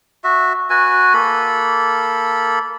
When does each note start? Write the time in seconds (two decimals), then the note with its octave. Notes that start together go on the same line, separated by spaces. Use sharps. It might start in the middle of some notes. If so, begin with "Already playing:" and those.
0.24 F#4 E5
0.70 F#4 B4 G#5
1.14 A#3 A4 B5